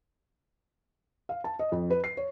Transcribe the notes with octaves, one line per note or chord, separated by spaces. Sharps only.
F5
A5
D#5
F2
B4
C7
C#5